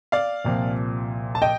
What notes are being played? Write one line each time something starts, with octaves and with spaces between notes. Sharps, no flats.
D5 F5
C2 A#2 F3 C4
A5
D#5 G5